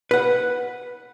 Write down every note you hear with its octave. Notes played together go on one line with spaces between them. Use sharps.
B4 F#5